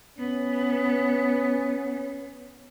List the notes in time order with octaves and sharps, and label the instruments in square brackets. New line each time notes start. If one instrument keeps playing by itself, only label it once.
[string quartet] B3 [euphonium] C#4